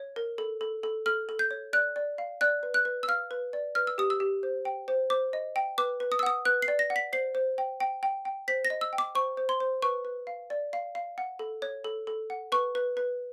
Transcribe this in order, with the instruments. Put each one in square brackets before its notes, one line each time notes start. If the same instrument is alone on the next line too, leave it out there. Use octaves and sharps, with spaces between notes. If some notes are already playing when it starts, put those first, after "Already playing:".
Already playing: [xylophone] C#5
A#4
A4
A4
A4
A4 F6
A4
G6
C#5
D5 F#6
D5
F5
D5 F#6
B4
F#6
B4
E6
F5 F6
B4
D5
B4 F6
E6
G4 D#6
E6
G4
C5
G5
C5
C5 D6
D#5
G5
B4 D6
B4
D#6
E6
F#5 D#6
B4 F#6
C7
D5
A#6
F#5
B6
C5 C7
C5
G5
G5
G5
G5
C5 B6
A#6
D#5
E6
G5
D6
C5 C#6
C5
C6
C5
B4 C#6
B4
F5
D5
F5
F5
F#5
A4
C#5
A4
A4
F#5
B4 C#6
B4
B4